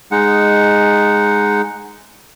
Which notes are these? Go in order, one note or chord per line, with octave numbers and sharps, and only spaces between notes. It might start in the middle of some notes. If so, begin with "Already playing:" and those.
G#3 D#4 F#5